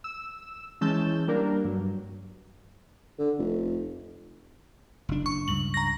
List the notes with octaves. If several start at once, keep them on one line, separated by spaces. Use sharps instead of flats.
E6
E3 G#3 C#4 A5 E6 G6
G3 A#3 D4 A#4
G2 F#3
D3
F1
F#1 D4
C#6
C#2 G2 F#7
A#5 A#6